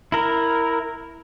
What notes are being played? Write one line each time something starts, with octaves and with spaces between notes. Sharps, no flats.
E4 A#4